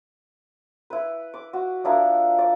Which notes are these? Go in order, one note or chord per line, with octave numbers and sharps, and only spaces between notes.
E4 B4
D6
F#4
F3 D4 E4 A#4
D5